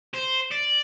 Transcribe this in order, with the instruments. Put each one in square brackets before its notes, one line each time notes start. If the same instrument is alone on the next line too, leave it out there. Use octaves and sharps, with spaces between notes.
[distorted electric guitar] C5
D5